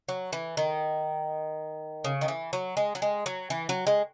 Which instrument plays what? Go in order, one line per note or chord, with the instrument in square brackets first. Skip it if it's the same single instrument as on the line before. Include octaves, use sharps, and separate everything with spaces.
[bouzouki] F#3
E3
D#3
C#3
D#3
E3
F#3
G#3
F#3
G#3
F#3
E3
F#3
G#3